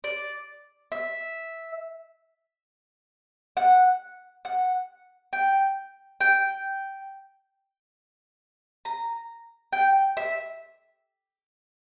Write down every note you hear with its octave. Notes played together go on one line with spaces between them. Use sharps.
D5
E5
F#5
F#5
G5
G5
A#5
G5
E5